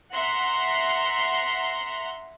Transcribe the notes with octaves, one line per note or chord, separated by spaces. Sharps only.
E5 F#5 A#5 C6